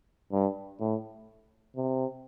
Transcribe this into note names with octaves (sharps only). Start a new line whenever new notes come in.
G2
A2
C3